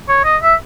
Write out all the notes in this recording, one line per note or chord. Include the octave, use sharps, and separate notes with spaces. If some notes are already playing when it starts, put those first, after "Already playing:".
C#5
D#5
E5